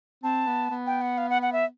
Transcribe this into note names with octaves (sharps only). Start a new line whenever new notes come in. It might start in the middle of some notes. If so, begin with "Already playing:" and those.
C4 A5
B3
B3
G5
F#5
F5
F#5
F#5
E5